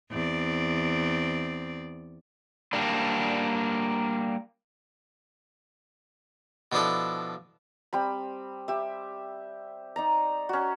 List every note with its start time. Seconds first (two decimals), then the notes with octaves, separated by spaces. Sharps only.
0.11 E2 C4 D5
2.73 G3 A#3 D4
6.72 B2 F3 D4 E4 A4
7.93 G3 C4 B5
8.68 G4 E5
9.96 D#4 D5 A#5
10.49 C#4 F#4